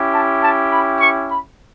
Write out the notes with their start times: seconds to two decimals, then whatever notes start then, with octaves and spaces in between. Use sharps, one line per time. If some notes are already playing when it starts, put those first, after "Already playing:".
Already playing: C#4 E4 G4
0.13 A5
0.42 A5
0.72 B5
1.00 C#6
1.29 B5